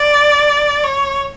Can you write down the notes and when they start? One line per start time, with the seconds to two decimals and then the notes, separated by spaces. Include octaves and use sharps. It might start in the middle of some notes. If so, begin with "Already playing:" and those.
Already playing: D5
0.83 C#5